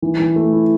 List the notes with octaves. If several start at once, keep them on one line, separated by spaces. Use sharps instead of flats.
E3
E3
A3
E4